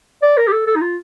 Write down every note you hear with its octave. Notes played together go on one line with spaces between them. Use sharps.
D5
A#4
G4
A4
A4
D#4
F4